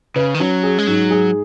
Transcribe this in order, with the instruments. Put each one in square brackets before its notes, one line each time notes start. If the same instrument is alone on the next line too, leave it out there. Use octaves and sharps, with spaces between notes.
[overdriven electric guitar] C#3 [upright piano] B4
[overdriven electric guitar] D#3
[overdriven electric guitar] F#3 [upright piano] C#4
[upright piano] G#4
[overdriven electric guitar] G#3
[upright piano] G#2 [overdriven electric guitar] F#3
[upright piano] G#4